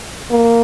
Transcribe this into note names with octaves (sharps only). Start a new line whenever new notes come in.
A#3